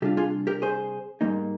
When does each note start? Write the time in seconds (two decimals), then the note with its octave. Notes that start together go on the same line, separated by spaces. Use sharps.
0.02 C3 G3 D4 F4 G4
0.17 F4 G#4
0.47 G4 A#4
0.62 G#4 C5
1.21 G#2 G3 A#3 D#4